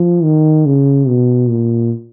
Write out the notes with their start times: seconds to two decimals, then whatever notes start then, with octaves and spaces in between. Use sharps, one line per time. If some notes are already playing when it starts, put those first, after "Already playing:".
Already playing: F3
0.23 D#3
0.66 C#3
1.07 B2
1.49 A#2